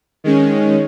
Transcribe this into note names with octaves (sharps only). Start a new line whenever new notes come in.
D#3 G#3 C#4